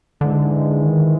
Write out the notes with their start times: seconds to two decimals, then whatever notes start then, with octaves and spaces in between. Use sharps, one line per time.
0.21 G#2 D3 E3 G#3
0.83 D#3